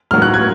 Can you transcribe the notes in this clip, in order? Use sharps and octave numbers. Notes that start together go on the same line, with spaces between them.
A2 F#3 A#3 F6
F#6
G#6